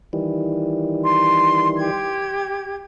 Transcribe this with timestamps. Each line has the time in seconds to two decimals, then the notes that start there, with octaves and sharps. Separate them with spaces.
0.13 D#3 E3 G3
1.04 C6
1.77 G4 G#6